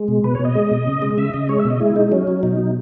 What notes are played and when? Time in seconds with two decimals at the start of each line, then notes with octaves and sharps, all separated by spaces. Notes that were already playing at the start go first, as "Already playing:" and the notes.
Already playing: G#3
0.08 B2
0.24 B2 B4
0.35 C#5
0.40 B2
0.45 D#5
0.55 G#3
0.71 B2
0.87 C#3
1.02 G#3
1.18 C#3 E5
1.34 C#3 D#5
1.49 G#3 C#5
1.59 E5
1.65 B2
1.70 D#5
1.80 G#3 E4
1.96 G#3 D#4
2.12 F#3 C#4
2.27 F#3
2.43 B2 D#4
2.58 F#3